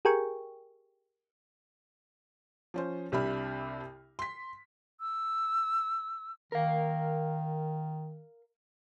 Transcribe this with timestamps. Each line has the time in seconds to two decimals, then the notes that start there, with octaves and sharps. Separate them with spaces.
0.05 G4 G#4 A#4 G5 G#5 C#6
2.74 F3 C#4 C5
3.12 C2 C3 D4 E5 B5 F6
4.19 C6 B6
4.99 E6
6.52 D#3 A#4 F5